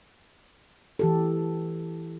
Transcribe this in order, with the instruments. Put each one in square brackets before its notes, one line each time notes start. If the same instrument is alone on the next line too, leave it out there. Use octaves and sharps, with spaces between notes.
[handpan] E3 G4 A4